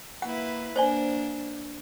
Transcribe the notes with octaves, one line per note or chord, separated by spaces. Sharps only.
A#3 E4 B4 F#5
A#3 D4 C5 D5 G#5